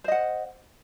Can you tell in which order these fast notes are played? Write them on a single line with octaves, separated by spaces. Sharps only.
C5 D#5 F#5